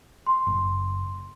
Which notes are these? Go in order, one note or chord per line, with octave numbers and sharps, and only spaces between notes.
C6
F#1